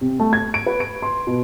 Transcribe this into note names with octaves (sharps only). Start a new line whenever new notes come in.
C3
A3
G#6
D7
B4
D7
C6
B2